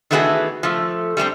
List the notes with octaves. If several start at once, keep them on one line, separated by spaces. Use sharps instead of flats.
D#3 E3 A3 B3 F#4 G#4
F3 A3
G3 A3 B3 C4